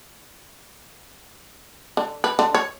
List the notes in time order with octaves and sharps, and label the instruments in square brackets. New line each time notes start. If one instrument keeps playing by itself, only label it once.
[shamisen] D3
B4
D3
C#5